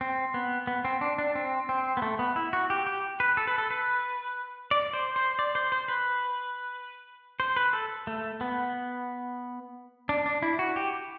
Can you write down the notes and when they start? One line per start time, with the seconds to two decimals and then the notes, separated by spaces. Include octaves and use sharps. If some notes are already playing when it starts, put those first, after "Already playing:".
0.01 C4
0.34 B3
0.67 B3
0.85 C4
1.01 D4
1.18 D4
1.35 C4
1.69 C4
1.97 B3
2.02 A3
2.19 B3
2.36 E4
2.53 F#4
2.70 G4
2.87 G4
3.20 B4
3.37 A4
3.47 B4
3.58 A4
3.71 B4
4.71 D5
4.93 C5
5.16 C5
5.39 D5
5.55 C5
5.72 C5
5.88 B4
7.40 C5
7.56 B4
7.73 A4
8.07 A3
8.41 B3
10.09 D4
10.26 D4
10.42 E4
10.59 F#4
10.76 G4